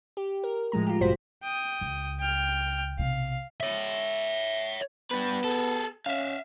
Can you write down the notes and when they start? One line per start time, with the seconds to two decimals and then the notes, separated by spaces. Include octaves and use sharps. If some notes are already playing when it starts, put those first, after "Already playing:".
0.17 G4
0.44 A#4
0.72 A2 F3 G#3 A#5
0.87 F4 G4
1.00 A1 G2 B2 F#4 C5 B6
1.43 G5 D#6
1.81 C#2 C#3
2.20 G5 F6
2.99 B1 C3 F5
3.60 C#5 E5
5.11 G3 B3 B4
5.44 G#4 A4
6.06 C#4 E5 F5